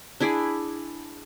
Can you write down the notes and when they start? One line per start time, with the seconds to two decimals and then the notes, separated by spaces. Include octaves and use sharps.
0.20 D4 E4 G#4 D5